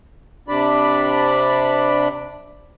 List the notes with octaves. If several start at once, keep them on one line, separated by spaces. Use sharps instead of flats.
C3 D4 D5 B5